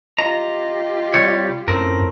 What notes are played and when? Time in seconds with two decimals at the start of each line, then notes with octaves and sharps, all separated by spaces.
0.18 F4 G4 D#5 A#5
1.14 C2 G3 C#5
1.68 F#2 A2 C4 A#4